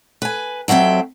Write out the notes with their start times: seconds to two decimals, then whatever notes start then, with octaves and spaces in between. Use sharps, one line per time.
0.22 B4 G#5
0.68 F2 F#3 C4 E5 G5